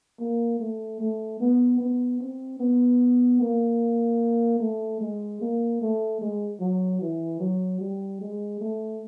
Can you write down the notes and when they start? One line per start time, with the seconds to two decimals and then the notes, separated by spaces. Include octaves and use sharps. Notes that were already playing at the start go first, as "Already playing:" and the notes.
0.20 A#3
0.60 A3
1.00 A3
1.40 B3
1.81 B3
2.20 C4
2.60 B3
3.41 A#3
4.60 A3
5.01 G#3
5.41 A#3
5.81 A3
6.21 G#3
6.60 F#3
7.02 E3
7.40 F#3
7.81 G3
8.21 G#3
8.61 A3